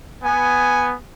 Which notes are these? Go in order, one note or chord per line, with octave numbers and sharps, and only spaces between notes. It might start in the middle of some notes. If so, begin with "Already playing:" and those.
B3 G#5